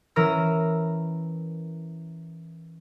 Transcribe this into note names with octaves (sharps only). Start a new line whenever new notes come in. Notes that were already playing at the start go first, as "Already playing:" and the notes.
E3 C#4 A#4 A#5 E6